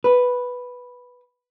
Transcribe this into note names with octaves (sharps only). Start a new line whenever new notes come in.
B4